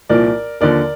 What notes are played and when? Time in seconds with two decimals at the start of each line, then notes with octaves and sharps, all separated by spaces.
0.09 C2 A#2 F3 A#4 D5
0.61 D#2 D3 F3 A#4 D5